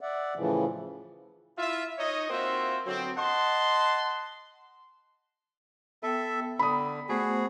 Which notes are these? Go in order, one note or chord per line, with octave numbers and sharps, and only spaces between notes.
D5 E5 F#5
A2 C#3 E3 F3
E4 F4 E5
D#4 C#5 D#5
A#3 C4 F4 F#4 C5 E5
D3 F#3 B3 C4
D#5 F#5 A5 C6
B3 A4 E5 G5
D3 B5 D#6
A3 B3 F#4 G#4 C5